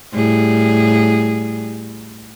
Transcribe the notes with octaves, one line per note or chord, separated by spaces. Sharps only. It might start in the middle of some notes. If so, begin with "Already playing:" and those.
A2 G3 G#4